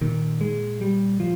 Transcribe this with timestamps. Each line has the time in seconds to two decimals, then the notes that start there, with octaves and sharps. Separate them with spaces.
0.01 A#2 D#3
0.41 G#3
0.81 G3
1.20 F3